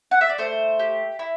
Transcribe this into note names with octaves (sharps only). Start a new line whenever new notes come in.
F#5
E5
D5
A3 C5
G4
E4